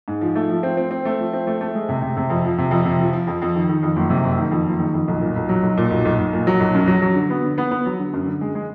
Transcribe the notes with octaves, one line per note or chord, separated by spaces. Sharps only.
G#2
F3
A3
F3
C4
C4
C4
A3
F3
C4
A3
A3
G#3
C3
C3
C3
F2
F3
C3
F2
C3
F3
F3
F2
F2
D#3
D#3
F2
F#1
C3
F#1
D#3
F2
F#1
D#3
F2
B1
A#2
B1
F#3
B1
A#2
B1
B1
B1
A#2
F#3
B1
F#2
F#3
F#3
D3
B3
D3
B3
B3
F#3
D3
F#2
D3
G#3
G#3